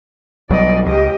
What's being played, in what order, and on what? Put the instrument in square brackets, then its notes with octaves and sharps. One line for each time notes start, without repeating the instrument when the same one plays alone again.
[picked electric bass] B1 F#3 G3 [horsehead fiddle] D5 D#5
[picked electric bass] C#2 [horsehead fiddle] G4 D#5